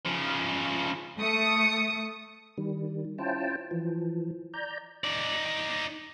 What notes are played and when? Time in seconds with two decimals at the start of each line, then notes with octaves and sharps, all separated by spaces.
0.06 C#3 F3
1.18 A3 D#6 C#7
2.58 D#3 G3
3.18 C#4 E4 F4 C5 G5 A5
3.71 E3 F3
4.54 D5 A#5 G6
5.04 D#4 D5